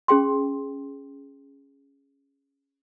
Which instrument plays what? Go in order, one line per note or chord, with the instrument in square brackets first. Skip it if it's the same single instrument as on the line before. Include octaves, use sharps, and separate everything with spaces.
[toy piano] C#4 G#4 G5 C6